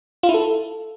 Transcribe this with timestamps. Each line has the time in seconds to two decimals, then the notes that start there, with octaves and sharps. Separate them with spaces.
0.23 F4
0.29 E4
0.34 A4